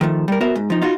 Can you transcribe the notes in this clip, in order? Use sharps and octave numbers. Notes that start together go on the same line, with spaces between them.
D#3 F3 A3
G3 A#4
B3 F#4 A#4 C5 E5
G#2
F3 D#4
D#4 F4 F#4